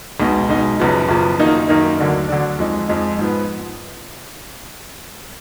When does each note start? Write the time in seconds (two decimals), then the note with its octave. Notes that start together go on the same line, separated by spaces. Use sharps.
0.20 B1 B2 G#3 D#4
0.49 B1 B2 G#3 D#4
0.79 F#1 F#2 F3 B3
1.09 F#1 F#2 F3 B3
1.39 F#2 D#3 A#3 D#4
1.68 F#2 D#3 A#3 D#4
1.98 D2 D3 F#3 D4
2.29 D2 D3 F#3 D4
2.59 F2 F3 G#3 D#4
2.89 F2 F3 G#3 D#4
3.19 G#2 F3 B3